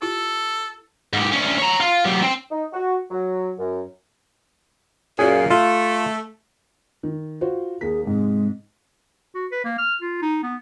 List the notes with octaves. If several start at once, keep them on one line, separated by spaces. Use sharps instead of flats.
E4 F4 G4 A4
G#2 G4
D2 C#4
C#5 A#5
F4
F#3 G4
C4
D#4
F#4
F#3
F#2
F#2 A#2 G#4
A3 F4 A4
D#3
F4 F#4 C5
D#2 A#3 G#4 B6
G#2 C3 G#3
F#4
B4
A#3
F6
F4
D#4
B3